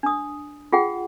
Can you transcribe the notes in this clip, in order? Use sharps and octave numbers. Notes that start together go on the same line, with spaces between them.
D4 D#6
F4 G#4 F#5 G5